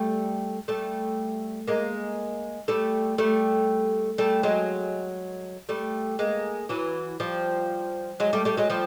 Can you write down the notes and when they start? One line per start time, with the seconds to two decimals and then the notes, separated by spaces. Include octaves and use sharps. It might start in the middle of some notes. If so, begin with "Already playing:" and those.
Already playing: G3 A3
0.68 G3 A3
1.68 G#3 A#3
2.68 G3 A3
3.18 G3 A3
4.18 G3 A3
4.43 F#3 G#3
5.69 G3 A3
6.19 G#3 A#3
6.69 E3 F#3
7.20 F3 G3
8.20 F#3 G#3
8.33 G3 A3
8.45 G3 A3
8.57 F#3 G#3
8.70 F3 G3